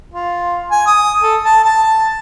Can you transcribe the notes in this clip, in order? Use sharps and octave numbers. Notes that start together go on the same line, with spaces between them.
F4
G#5
D#6
A4
A5
A5